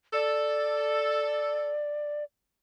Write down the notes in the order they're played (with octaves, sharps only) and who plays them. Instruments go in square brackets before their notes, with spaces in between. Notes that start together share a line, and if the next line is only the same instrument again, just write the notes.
[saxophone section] A4 [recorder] D5